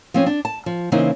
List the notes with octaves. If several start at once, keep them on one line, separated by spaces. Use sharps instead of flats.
F3 C4 C#4
D4
A5
F3
C#3 E3 A#3 C4 D#4